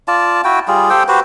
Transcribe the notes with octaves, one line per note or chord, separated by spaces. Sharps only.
F4 D5 A5
E4 F#4 G5
G3 F4 G#4
G4 A4 C5 G5
F#4 G4 B4 C5